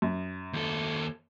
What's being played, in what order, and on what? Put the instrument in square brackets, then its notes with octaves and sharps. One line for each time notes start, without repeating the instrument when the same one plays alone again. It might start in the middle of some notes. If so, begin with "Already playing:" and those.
[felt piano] F#2
[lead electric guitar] D#2 A4